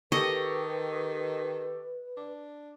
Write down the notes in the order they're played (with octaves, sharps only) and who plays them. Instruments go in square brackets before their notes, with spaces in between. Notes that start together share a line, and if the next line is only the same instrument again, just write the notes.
[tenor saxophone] D#3 [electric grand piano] G4 A4 C#6 [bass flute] B4 [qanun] D#5
[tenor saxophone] D4